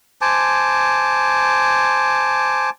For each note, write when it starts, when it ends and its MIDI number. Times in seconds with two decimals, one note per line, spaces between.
0.21 2.70 72
0.21 2.70 80
0.21 2.70 81
0.21 2.70 86